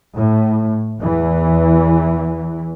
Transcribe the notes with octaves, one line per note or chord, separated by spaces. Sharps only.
A2
E2 E3